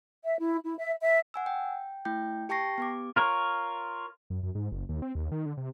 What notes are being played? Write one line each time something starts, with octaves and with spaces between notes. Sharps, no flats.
E5
E4
E4
E5
E5
F#5 G#5 E6
G5
A3 E4 G5 G6
G4 G5 A5 C#6 A#6 C7
B3 G4 D6
F4 A#4 C#5
F#2
F#2
G#2
F#1
D#2
C4
D#2
D#3
D3
C3